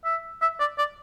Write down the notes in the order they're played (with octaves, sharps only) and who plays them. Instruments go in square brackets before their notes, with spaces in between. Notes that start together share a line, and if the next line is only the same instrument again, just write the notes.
[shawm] E5
E5
D5
D5